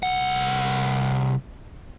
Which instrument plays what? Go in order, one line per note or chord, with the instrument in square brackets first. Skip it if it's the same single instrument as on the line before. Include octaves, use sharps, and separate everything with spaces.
[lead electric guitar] C2 F#5